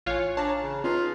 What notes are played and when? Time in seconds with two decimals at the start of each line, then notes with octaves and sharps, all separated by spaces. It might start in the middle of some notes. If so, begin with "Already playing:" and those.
0.06 A1 F4 C#5 F5 G#5 C#6 F#6
0.37 D4 C#5 A5 A#5
0.62 C#3
0.84 C#4 D#4 F4 G#4 B4